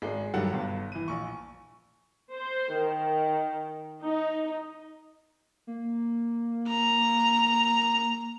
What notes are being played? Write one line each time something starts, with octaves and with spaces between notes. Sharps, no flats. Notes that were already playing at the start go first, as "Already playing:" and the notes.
G#1 G#3
G2 D#3 F#3 G4 A4 F#5
G1 G2
E3 D#7
A#1 C#6
C5
D#3
D#4
A#3
A#5